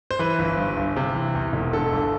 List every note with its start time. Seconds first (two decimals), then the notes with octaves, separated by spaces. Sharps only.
0.11 C5
0.19 E3 B4
0.39 G1
0.57 G2
0.77 G1
0.96 C3
1.15 E3
1.35 E2
1.53 E1
1.73 D3 A4
1.92 G1